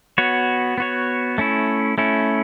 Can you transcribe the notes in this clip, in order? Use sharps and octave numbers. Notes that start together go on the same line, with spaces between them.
B3 F#4 C#5
B3 F#4 C#5
A3 C#4 E4
A3 C#4 E4